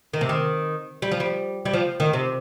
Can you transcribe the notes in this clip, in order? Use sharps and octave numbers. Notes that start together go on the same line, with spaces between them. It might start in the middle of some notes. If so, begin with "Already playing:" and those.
D#3
C3
D#3
G3
F3
G3
G3
F3
D#3
C3